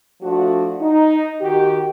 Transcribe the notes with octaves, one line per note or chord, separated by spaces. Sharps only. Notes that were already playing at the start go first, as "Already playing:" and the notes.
F3 A3 D4 F#4
D#4
D#3 F#4 G4